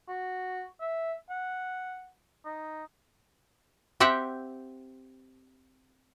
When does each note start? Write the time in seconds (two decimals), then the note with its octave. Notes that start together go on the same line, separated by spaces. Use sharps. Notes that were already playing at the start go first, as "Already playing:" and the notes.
0.09 F#4
0.81 E5
1.30 F#5
2.45 D#4
4.00 C4 G4 E5 F#5 G5